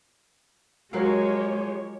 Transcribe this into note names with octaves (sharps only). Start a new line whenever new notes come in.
F3 F#3 G#3 G4 A#4 C#5 F5